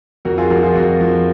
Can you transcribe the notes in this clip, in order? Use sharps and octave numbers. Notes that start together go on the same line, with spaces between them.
F2 F#4 A#4
F4 G#4
F3 F#4 A#4
F4 G#4
F2 F#4 A#4
F3